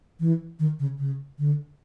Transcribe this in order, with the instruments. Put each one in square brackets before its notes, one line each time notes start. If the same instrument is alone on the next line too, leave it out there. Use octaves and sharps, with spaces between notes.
[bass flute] E3
D#3
C#3
C#3
D3